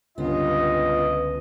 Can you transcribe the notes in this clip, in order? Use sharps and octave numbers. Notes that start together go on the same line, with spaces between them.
C#2 G2 D3 B3 C#4 F4 D#5